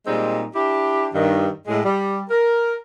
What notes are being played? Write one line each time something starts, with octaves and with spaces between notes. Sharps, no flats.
A#2 G3 G#3 C4 D#4
D4 E4 G4
G2 D#3
A2 G#3
G3
A#4